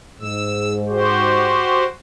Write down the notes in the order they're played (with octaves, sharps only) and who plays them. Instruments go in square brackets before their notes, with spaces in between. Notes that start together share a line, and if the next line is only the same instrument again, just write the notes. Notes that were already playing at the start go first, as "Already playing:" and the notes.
[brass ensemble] G#2 [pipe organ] E6
[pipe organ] F#4 G4 C5